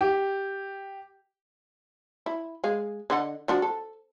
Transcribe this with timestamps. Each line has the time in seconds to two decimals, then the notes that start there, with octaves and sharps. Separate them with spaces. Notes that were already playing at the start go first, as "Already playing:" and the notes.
0.01 G4
2.26 E4
2.64 G#3 F5
3.10 D3 D#5 F#5
3.48 F3 D4 F#4
3.62 A4